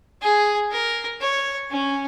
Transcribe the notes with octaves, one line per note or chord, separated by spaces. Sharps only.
G#4
A#4
C#5
C#4